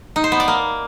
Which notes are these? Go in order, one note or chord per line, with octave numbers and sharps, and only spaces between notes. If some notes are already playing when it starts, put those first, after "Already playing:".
D#4
C5
B3
D5
A#3